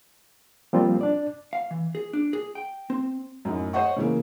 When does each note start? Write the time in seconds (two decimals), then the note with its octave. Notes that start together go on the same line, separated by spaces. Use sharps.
0.73 F3 G3 A#3 C4 F4
1.01 D4 D5
1.53 F5
1.71 E3
1.95 G#4
2.13 D4
2.33 G#4
2.55 G5
2.90 C4
3.45 F#2 A2 D#4
3.73 C5 C#5 D#5 F#5 C#6
3.96 C#3 E3 A#3